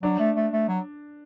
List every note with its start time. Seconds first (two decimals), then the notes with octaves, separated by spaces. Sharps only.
0.03 F#3 D4
0.19 A3
0.36 A3
0.53 A3
0.68 F#3